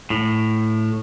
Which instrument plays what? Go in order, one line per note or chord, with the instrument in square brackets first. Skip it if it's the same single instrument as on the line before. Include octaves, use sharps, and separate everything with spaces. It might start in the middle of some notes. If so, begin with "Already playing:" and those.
[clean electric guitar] A2